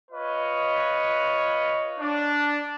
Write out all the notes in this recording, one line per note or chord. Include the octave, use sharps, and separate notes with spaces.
F4 B4 C#5 D#5
D4